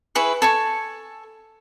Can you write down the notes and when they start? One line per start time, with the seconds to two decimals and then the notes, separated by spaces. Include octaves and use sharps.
0.15 E4 G#4 B4 C#6
0.42 A4 G#5 C#6